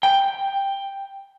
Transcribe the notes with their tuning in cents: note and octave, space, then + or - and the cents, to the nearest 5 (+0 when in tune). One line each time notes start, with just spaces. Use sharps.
G5 +5